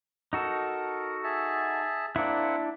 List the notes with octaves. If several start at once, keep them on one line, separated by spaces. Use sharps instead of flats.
D#4 F#4 A4 A#4
G#4 E5 A5
A#3 C4 D4 E4 F#5